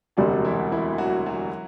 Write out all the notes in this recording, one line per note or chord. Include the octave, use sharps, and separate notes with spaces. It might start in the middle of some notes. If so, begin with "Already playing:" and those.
E1 D2 C3 F#3 G3 F#4
E3 E4
E3 E4
F#3 F#4
F#3 F#4